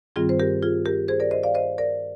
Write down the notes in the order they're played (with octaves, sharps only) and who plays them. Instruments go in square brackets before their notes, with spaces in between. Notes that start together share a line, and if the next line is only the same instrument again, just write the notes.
[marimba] G2 D#3 G3 C4 F4 G#4
C5
G4 A#4
F4 G#4
G4 A#4
G#4 C5
A#4 D5
C5 D#5
D5 F5
C5 D#5
A#4 D5